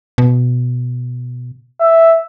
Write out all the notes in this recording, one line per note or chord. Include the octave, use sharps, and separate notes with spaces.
B2
E5